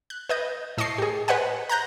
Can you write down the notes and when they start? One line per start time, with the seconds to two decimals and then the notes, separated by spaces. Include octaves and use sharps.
0.10 F#6
0.29 B4 D#5 G6
0.77 A2 D#5 A5 C#6 C7
0.98 G4 G#4
1.28 B4 C5 D#5 F#5 G#5
1.69 A#5 F#6 G6 A#6